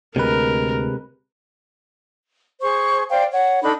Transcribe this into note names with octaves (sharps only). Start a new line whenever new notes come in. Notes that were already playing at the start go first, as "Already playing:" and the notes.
D2 C3 G#3 A#4 B4
G#4 C5 C#6
C5 D5 F5 G5
C#5 F#5
D4 D#4 A4 B5